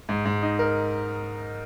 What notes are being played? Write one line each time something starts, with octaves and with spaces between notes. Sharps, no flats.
G#2
G#2
D#4
A#4